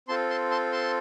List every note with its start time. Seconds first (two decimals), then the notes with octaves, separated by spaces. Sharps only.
0.08 C4 F4 A4 A5 C6
0.30 A5 C6
0.51 A5 C6
0.72 A5 C6